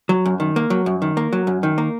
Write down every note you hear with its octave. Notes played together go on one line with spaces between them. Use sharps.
F#3
F#2
D#3
A#3
F#3
F#2
D#3
A#3
F#3
F#2
D#3
A#3